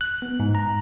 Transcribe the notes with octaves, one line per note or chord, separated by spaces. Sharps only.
F#6
B3
G#2
A#5